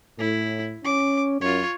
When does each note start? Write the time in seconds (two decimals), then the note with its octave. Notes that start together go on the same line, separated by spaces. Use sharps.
0.19 A2 E4
0.84 C#4 D6
1.41 F#2 F4 C#5